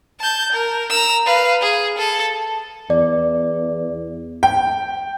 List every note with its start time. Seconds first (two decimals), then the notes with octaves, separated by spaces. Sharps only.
0.20 A5 G6
0.52 A#4
0.89 A#5 E6
1.26 B4 F5
1.61 G#4
1.98 A4
2.90 E2 D5
4.43 G5